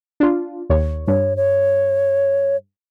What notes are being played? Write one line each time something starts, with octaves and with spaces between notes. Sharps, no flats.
D4 F4
D#2 C#5
G2 C#5
C#5